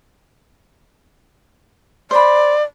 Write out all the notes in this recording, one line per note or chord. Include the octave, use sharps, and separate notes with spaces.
C5 D5 B5